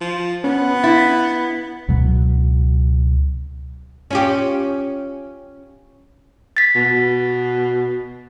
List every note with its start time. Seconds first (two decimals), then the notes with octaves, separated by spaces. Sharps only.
0.01 F3
0.44 B3 C#4
0.84 E4 A6
1.88 C#2 B2 F#3
4.11 C#4 F4 G4
6.57 A6 B6
6.75 B2